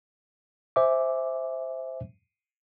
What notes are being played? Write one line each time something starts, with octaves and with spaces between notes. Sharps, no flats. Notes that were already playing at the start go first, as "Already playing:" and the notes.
C5 E5 G#5 D6